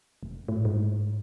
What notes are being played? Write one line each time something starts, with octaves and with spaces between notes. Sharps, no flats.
F1
A2
G#2